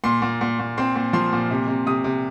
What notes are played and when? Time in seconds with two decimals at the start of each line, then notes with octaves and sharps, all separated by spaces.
0.04 A#2 C6
0.22 A#2
0.41 A#2
0.59 A#2
0.77 C4 C6
0.96 A#2
1.13 F3 C6
1.32 A#2
1.51 C3
1.68 C3
1.86 C3 D#6
2.04 C3